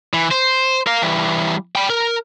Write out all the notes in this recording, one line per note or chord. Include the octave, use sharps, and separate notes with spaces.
E3
C5
A#4 F5
E3 G3
G5 B5
A#4